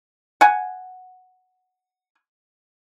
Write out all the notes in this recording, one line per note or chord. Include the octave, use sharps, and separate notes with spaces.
F#5 G#5